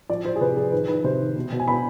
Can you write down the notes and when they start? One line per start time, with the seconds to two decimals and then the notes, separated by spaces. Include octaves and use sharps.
0.10 F3 D5
0.24 F3 C5
0.36 G#4
0.41 C3 B4
0.57 F3 G#4
0.72 D#3 B4
0.88 D#3 B4
1.04 C3 C5
1.20 D#3
1.36 B2
1.52 B2
1.60 G#5
1.68 B2 B5